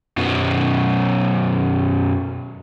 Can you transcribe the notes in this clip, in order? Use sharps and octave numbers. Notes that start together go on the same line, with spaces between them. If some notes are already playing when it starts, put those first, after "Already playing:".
F#2 B2